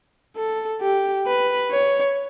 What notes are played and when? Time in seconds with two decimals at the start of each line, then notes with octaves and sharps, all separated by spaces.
0.36 A4
0.81 G4
1.26 B4
1.71 C#5